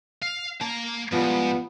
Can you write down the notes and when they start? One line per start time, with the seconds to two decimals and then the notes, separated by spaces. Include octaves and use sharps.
0.22 F5
0.61 A#3 A5 A#5
1.12 G#2 F3 G3 B3